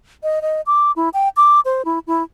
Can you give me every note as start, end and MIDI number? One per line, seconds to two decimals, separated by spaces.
0.23 0.39 75
0.42 0.61 75
0.66 0.92 86
0.96 1.09 64
1.14 1.29 79
1.37 1.60 86
1.65 1.82 72
1.85 1.99 64
2.07 2.23 64